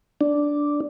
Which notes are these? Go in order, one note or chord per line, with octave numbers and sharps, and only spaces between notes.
D4